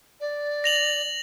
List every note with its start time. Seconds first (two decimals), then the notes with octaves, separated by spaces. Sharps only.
0.20 D5
0.64 A#6 F7 F#7